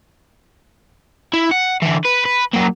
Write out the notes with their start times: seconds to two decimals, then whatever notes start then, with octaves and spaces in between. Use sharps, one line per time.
1.34 E4
1.51 F#5
1.82 D3 E3
2.05 B4
2.25 B4
2.54 F#3 A#3